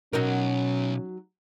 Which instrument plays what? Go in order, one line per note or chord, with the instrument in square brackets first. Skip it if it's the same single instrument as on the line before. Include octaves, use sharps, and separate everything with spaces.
[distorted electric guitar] B1 [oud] F#3 D#4 A#4 [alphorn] C#4